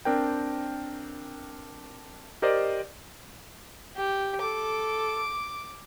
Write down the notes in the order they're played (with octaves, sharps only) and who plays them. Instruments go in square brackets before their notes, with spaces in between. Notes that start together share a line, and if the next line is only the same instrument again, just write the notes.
[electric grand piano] C4 D4 A#4 G5
G4 A#4 C5 D5 D#5
[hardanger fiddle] G4
[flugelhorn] A4 [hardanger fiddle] D6